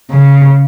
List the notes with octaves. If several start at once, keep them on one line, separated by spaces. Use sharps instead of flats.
C#3